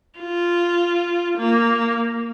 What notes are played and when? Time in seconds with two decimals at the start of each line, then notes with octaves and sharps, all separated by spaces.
0.19 F4
1.38 A#3